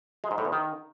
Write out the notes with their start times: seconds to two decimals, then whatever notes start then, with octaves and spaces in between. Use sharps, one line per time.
0.24 G#3
0.31 G#2
0.38 A2
0.45 E2
0.52 D#3